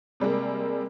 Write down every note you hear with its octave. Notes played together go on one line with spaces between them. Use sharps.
C3 G3 G#3 A#3